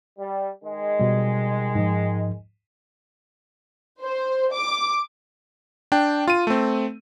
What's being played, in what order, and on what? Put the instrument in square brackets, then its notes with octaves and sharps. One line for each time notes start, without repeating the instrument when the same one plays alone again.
[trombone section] G3
D#3 G#3
[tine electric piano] B2 G3
G#2 F3
[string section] C5
D6
[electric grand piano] D4 G5
F4 D#7
A3 C4